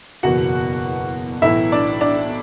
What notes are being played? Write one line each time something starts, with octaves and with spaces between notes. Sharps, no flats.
F#1 E2 B2 F#4 F#5
B1 A2 E3 E4 E5
D4 D5
D4 D5